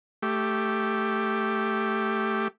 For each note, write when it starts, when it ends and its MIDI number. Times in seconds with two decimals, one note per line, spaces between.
0.23 2.48 57
0.23 2.48 67